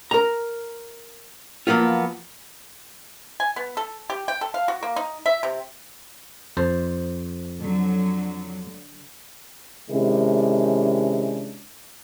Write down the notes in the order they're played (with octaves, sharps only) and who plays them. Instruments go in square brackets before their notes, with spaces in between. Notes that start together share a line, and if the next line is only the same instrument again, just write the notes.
[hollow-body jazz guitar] A#4 A#5
F3 F#3 A#3 B3 F4
[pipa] G#5
B3
A4
G4
G5
A4
F5
F#4
A#3
D#4
E5
C3
[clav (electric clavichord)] F2 C5 A5
[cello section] D3 F#3
[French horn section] C3 D#3 G#3 C#4 D4 E4